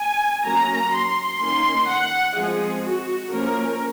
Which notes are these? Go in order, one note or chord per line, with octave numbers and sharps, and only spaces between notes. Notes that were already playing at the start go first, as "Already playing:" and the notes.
Already playing: G#5
F#3 A#3 C#4 A#5
C6
D#3 A#3 C#4 C6
F#5
F3 G#3 C4 G#4
F#4
F3 A#3 C#4 A#4